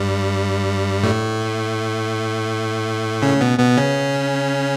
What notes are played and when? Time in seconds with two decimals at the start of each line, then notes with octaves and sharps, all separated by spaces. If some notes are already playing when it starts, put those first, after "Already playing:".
Already playing: G2 G3
1.03 A2 A3
3.22 C#3 C#4
3.41 B2 B3
3.59 B2 B3
3.77 C#3 C#4